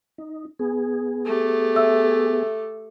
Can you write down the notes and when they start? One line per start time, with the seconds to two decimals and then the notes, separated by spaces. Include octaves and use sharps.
0.18 D#4
0.59 B3 G#4
1.25 A3 G4
1.76 E5 E6